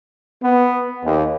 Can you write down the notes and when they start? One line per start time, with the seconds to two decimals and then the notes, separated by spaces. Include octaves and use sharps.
0.44 B3
1.05 D#2